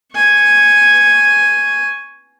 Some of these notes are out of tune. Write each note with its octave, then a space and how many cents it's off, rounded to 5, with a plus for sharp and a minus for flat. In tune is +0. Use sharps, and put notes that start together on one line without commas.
G#5 +0 C#6 +0